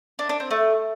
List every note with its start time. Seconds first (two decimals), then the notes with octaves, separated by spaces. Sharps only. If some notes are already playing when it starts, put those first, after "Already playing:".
0.19 D4
0.29 D4
0.40 C4
0.51 A3